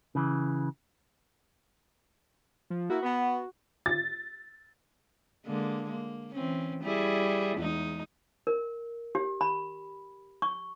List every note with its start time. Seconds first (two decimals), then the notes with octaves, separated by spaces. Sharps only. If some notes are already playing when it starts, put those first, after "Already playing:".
0.15 C#3 E3
2.70 F3
2.90 A#3 E4 F#4
3.03 B3
3.86 A6
5.46 D3 G#3 A#3
5.89 A#3
6.35 E3 C4 C#4
6.83 G3 E4 G#4
7.58 E2 G#3 D#4
8.47 A#4
9.15 G4
9.41 B5
10.42 C#6